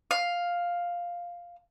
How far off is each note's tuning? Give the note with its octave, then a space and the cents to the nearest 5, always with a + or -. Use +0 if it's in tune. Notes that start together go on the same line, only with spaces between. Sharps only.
F5 +5